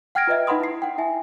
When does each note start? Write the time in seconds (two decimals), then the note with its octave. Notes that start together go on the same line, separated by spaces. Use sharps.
0.15 F#5 G5 F6 G#6 A#6 D7
0.27 F4 B4 D#5 E5
0.47 D#4 B4 F#5 B5 C6 D#6
0.60 E4 C7
0.82 F#5 G5
0.98 E4 E5 G#5